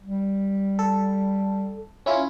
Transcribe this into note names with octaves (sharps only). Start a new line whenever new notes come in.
G3
A4
C#4 E4 F4